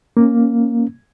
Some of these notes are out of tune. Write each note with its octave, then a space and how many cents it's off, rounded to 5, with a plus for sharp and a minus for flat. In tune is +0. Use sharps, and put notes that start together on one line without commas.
A#3 +0 C#4 -10